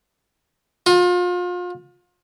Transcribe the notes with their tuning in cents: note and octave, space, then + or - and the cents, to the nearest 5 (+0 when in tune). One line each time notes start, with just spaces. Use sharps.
F4 +35